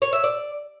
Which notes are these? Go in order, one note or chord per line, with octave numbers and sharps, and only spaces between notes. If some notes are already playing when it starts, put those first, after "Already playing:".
C#5
E5
D5